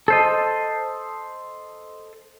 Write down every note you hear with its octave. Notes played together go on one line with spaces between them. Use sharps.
A4 C5 D#5